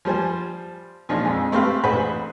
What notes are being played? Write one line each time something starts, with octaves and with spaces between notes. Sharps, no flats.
F3 G3 C5 G#5
A#2 F3 G#3 D4 D#4 F4
F2 G#3
A3 C4 G4 B4 F5
A1 G#4 B4 C5 F#5 B5